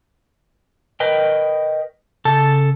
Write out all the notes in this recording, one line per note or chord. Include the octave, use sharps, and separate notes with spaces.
A#4 B4 D#5 G5
C#3 A4 A5